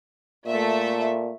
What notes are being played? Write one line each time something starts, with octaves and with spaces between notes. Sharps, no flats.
A#2 A3 E5